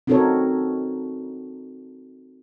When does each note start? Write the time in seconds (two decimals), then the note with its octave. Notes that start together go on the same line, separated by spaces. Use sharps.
0.07 C4 D#4 F#4 A4 A#4 C#5